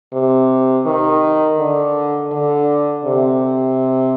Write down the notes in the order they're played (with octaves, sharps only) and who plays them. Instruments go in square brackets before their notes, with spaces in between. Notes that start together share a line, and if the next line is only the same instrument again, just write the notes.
[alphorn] C3
D#3
D3
D3
C3